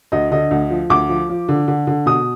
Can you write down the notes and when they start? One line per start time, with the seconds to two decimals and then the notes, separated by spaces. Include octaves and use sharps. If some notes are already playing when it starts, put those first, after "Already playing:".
0.12 D2 D#5
0.31 D3 D#5
0.51 D2
0.71 F3
0.90 D2 D6
1.09 F3
1.29 F3
1.49 D3
1.68 D3
1.87 D3
2.06 B2 D#6